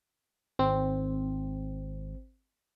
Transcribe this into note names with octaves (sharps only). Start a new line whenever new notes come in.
G#1 C4